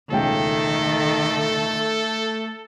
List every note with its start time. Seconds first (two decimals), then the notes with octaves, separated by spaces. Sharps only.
0.11 E1 C#2 D#3 A3 A4 G5